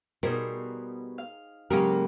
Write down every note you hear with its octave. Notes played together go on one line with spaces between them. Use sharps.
B2 G3 D#4 G#4 A#4 C5
F5
G#2 C#3 F#3 A#3 C#4 G4 A#4